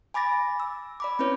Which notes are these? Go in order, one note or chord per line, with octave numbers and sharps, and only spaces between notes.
G#5 B5 D6 A6 A#6
E6
D5 B5 D6
C4 C#4 E4 B4 C#5